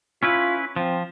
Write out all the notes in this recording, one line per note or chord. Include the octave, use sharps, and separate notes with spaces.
C#4 E4 F4 B4
F3 C4